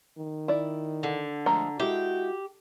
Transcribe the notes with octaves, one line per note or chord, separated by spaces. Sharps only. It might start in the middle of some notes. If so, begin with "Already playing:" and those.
D#3
E4 D5
D3
F3 G#3 A3 A#5
G#3 E4 F#4 G4